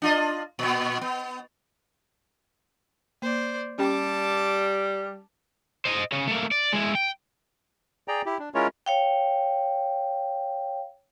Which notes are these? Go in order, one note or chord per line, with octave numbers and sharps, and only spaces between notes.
D4 F4 D#5
A#2 B3
B3
A#3 C5 D5
G3 C#4 G4 G5 A5 D6
C5 D#5
C#3 C#4
A3 A#3
D5
G#3 E4
G5
G#4 D5 G5 A#5
E4 G4
D4
G#3 C#4 E4 F4 A#4 C#5
C#5 F5 G5